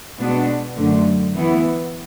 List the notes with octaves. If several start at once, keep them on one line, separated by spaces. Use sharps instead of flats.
B2 G#3 B3 D4
F#2 D3 A3
E3 B3 E4